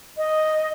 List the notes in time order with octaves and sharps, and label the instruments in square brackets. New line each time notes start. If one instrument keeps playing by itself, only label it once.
[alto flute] D#5